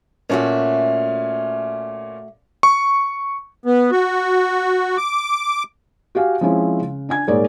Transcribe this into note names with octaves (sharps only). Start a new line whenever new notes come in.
A#2 A3 C#4 F#4 E5
C#6
B3
F#4
D6
F#4 G4 F5 G#5
F3 G#3 C4 C#4 E4
C#3
D4 G#5 G#6
D#1 G#2 G#3 A#4 C#5 D5